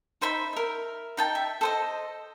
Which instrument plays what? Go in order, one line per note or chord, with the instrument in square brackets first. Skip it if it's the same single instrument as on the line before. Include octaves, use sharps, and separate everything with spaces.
[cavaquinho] D#4 C5 E5 B5
A#4 E5
D#4 G5 A5
E5
A4 C5 D#5